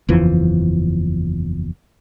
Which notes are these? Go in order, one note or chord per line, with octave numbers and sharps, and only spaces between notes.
F#1 E2 E3 F3